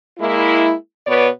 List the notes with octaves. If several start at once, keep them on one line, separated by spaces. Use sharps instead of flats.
G#3 A#3 E4
B2 B3 B4 C#5 D5